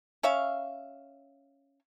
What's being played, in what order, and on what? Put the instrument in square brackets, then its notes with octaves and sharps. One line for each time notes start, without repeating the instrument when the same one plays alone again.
[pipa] C#4 C#5 E5 F5